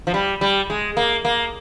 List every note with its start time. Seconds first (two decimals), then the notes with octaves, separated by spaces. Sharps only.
0.07 F3
0.14 G3
0.41 G3
0.70 G#3
0.97 A#3
1.25 A#3